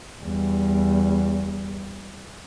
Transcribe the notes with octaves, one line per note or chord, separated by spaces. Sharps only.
E2 G3